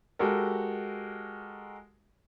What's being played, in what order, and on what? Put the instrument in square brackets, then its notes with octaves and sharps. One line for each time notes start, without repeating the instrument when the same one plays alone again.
[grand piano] G#3 F#4 G4 A4 A#4